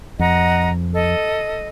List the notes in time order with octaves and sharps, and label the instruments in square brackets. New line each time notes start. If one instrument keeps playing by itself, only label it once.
[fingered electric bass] F2 [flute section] D#5 F#5 A#5
[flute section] A4 D#5